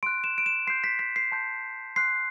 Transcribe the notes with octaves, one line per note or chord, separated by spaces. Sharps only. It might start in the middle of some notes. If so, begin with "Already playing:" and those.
C6 F#6 D7
E7
D7
E7
C6 G6 C7
B6
B6
C7
A5 C6 G6
C6 F#6 C7